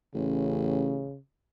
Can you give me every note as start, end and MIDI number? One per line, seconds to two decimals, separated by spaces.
0.15 1.08 33
0.15 1.19 49